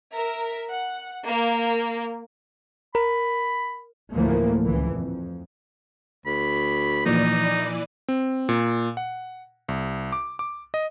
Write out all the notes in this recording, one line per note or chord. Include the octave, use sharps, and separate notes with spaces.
A#4 E5
F#5
A#3
A#4 B5
D2 A2 E3 F3 A3 A#3
C#2 E3
F2
D2 B5
A#2 E3 F3 A#3 D#4 D5 D#7
C4
A#2
F#5
C2
D6
D6
D#5